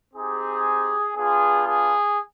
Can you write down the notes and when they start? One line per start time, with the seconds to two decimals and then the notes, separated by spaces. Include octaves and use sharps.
0.14 C4 D#4 G4 G#4
1.15 B3 D4 F4 G#4
1.66 G#4